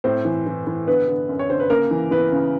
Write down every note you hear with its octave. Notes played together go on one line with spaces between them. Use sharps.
A2 C4 C5
E3
E3
E3
D3 B3 B4
D3
F#2
C#5
D3 C5
B4
C#3 A#3 A#4
E3
E3 B3 B4
C#3